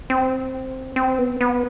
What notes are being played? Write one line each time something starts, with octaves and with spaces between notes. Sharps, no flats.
C4
C4
B3
B3